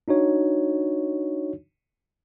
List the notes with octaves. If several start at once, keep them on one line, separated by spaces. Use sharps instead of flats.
D4 D#4 F#4 C#5